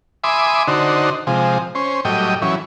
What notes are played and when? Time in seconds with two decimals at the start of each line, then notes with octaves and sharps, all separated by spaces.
0.24 E5 G#5 B5 C6 D6 D#6
0.67 D3 D#4 F#4 C5
1.27 C3 F3 G#3
1.75 C#4 C5
2.05 A2 F#3 G3 D#5 G5
2.42 E3 F#3 C#4